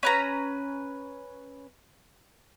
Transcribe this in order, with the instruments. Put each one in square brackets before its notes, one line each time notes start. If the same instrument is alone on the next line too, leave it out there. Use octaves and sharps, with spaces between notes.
[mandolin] C#4 B4 A#5